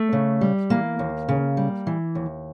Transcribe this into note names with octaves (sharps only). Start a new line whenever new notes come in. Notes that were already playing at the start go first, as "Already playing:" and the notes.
Already playing: A3
C#3
G3
E3 A#3
D#2
C#3
G3
E3
D#2